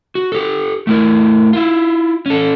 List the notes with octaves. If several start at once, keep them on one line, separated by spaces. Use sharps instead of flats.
F#4
G4 A4
A3 E4 A#4
E4 F4
C#4 A4